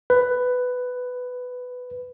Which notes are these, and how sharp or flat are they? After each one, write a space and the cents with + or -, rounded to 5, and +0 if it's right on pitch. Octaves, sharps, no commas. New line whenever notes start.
B4 +10